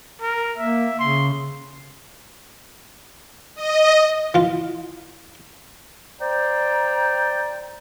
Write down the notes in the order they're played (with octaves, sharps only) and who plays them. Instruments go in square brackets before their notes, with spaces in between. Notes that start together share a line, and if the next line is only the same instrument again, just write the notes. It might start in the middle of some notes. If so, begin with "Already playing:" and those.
[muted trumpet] A#4
[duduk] A#3 [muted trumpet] E5
[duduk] C#3 [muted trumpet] C6
[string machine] D#5
[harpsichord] E3 F4
[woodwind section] C5 D5 G5 A#5